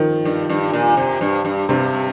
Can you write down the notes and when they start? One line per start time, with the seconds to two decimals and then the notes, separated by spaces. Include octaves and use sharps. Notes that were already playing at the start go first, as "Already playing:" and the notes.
Already playing: D#3 F3
0.25 G2
0.49 G2
0.73 A#2
0.97 C3
1.21 G2
1.45 G2
1.69 G2 C3